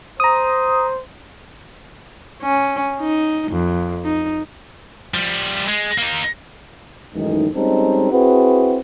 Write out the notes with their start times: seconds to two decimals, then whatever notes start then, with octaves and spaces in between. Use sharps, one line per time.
0.20 C5 A#5 D#6
2.42 C#4
3.00 D#4
3.52 F2
4.05 D#4
5.14 F3 G3
5.68 G#3
5.98 A#3 D#4
7.14 F#2 A2 D#3 E3 G#3 D#4
7.54 G3 G#3 C4 C#4 D#4 A4
8.11 C4 E4 F#4 G#4 B4